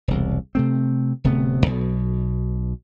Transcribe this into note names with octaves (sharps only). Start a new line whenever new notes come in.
E1 C2
C3 A3 C4
D1 C3 A3 B3
B1 B2